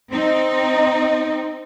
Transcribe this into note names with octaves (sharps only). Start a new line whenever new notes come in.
C4 D#4